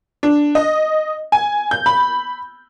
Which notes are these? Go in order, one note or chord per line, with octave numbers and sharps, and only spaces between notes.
D4
D#5
G#5
G6
B5